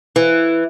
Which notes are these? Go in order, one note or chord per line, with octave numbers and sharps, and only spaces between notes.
E3